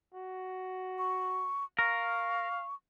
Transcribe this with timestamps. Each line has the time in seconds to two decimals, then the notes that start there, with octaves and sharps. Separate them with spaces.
0.14 F#4
0.98 C#6
1.79 A#4 F5 C#6